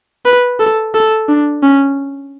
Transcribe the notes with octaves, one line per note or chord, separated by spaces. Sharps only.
B4
A4
A4
D4
C#4